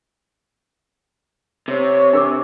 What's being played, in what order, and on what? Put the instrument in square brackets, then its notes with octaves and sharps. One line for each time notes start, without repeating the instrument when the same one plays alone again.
[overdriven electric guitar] C3 [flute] C#5
[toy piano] D4 A#4 D6